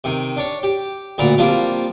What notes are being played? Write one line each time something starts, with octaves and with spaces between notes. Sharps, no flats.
C3 D#3
D4 C#5
G4
D2 A#2 D5 A#5 B5
F3 G3 A#3 C4 D4 F4